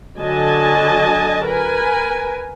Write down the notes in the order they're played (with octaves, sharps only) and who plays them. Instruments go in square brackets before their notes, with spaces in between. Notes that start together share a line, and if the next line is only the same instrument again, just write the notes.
[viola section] D3 F#3 D#5 G#5 A5
A#4 B4 G#5